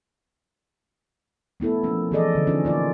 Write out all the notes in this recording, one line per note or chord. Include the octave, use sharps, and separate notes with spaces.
A3 B3 E4 A4
F3 A#3 C#4
E3 F3 G#4 A4 D5 D#5
D3
C#4 D#4 F4
A#3 F4 D5